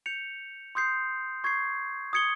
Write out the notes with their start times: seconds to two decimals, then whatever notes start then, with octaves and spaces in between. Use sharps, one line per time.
0.06 G6 C#7 F7
0.75 C6 D#6 G6 C7
1.44 C#6 G#6 C7
2.13 D#6 G#6 C#7 G7